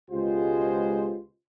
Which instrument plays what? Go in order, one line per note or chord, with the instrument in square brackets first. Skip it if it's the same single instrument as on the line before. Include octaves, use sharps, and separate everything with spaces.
[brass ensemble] C#2 B2 G#3 F4 G4 C5